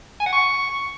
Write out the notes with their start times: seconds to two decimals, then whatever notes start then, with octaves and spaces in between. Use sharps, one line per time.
0.20 G#5
0.26 F#5
0.32 C#6